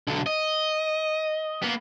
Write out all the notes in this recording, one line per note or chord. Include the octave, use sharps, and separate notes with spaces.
B1 D3
D#5
A#3 B3